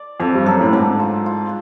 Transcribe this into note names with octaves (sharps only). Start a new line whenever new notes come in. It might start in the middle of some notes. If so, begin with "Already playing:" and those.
Already playing: D5
F2 A4
G2
F#2 A4
A2
G#2 D4
F4
F4